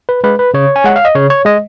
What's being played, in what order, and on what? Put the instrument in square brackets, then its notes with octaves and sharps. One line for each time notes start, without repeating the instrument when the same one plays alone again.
[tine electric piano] B4
G#3 B4
B4
C#3 C#5
G#5
G#3 F#5
F5
D#5
C#3 C#5
C#5
G#3 D#5